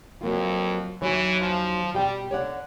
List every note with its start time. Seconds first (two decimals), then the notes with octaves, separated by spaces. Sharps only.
0.21 F2 F#3 A#3 F4
1.02 D#2 E3 F#3 C#5
1.40 F3
1.94 B2 G3 G4 G5
2.31 D3 C#5 D5 F#5